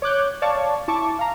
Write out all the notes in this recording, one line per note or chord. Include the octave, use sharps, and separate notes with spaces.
C#5 D6 F#6 G6
C#5 D5 F5 A5 C#6 D6
E4 A5 C#6 D6
F5 A#5